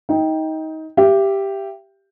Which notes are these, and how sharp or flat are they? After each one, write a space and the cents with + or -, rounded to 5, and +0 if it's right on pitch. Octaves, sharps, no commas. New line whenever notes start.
D#4 +25 G5 +0
G4 +0 E5 +35